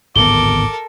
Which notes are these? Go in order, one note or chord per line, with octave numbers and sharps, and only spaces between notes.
D1 G#1 B3 A4 A#4 D6 G7